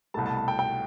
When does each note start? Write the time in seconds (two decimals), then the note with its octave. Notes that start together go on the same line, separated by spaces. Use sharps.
0.14 C2 B2 A3 A5
0.26 A5
0.37 A5
0.48 G5
0.59 G5